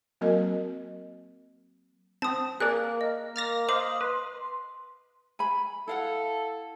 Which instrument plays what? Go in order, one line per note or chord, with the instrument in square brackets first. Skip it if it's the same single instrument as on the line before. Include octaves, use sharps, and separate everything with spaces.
[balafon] F#3 A#3 C4 F#4 A#4 D#5
[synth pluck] C4 [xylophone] A5 D#6
[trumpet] A#3 [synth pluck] G#4 A#4 D5 [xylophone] F#6
[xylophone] D#5
[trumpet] A#3 [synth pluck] F6 A6 A#6
[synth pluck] C5 F5 [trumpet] D#5 [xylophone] D6 F#7
[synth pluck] B4 [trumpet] C6
[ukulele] G#5 B5
[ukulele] E4 F5 F#5 [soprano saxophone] A4